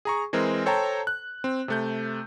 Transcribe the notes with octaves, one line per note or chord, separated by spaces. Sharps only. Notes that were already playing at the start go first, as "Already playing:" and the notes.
G#4 A#5 C#6
E3 G#3 C4 A#4
A4 C5 C#5 G5 A5 A#5
F#6
C4
C3 A3 G6